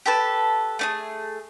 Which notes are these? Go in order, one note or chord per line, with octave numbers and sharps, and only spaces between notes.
G4 A4 B4 A5
A3 D4 G#4